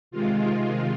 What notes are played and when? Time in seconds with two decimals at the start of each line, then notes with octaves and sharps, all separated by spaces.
0.11 C3 D#3 G#3 F4
0.59 F4